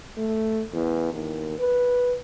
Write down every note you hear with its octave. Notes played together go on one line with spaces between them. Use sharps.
A3
E2
D#2
B4